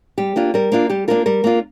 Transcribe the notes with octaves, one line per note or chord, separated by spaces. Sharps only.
G3 G4
A#3 D4 F4
G3 A#4
A#3 D4 F4
G3 G4
A#3 D4 F4 A#4
G3 A#4
A#3 D4 F4